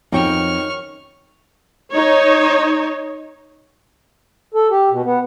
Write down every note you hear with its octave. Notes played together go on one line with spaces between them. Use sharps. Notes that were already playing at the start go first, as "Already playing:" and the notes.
F2 D#3 F#3 C#4 D#4 G5 C#6 F6
D#4 C#5
A4
G4
B2
B3